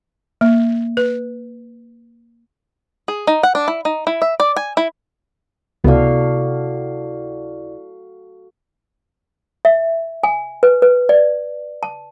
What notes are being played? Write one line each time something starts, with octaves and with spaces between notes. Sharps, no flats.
A#3
B4
G#4
D#4
F#5
D4
E4
D#4
E4
E5
D5
G#5
E4
C#2 C3 B3 E4 F#4 A4 D5 F5
E5
G#5
B4
B4
D5
A5